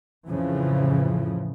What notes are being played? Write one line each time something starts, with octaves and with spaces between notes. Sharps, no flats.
F2 A2 C#3 E3 F3